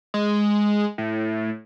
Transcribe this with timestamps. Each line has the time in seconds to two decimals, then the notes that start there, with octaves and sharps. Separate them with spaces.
0.14 G#3
0.98 A2